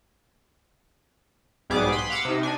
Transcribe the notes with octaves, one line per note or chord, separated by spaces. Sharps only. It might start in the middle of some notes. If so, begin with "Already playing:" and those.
B1 G#2 G3 B3 G#4 D6
B5 C6
F5 F#5 D6 E6
C3 D#4
D4 G#5